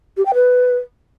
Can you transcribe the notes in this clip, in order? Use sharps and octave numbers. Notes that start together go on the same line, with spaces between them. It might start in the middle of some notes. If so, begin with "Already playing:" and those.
G4
G5
B4